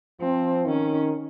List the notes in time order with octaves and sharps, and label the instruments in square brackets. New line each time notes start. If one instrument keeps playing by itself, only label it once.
[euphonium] F3 [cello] C4
[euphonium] D#3 [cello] C#4